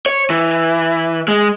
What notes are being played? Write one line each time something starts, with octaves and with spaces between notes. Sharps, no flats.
C#5
E3
G#3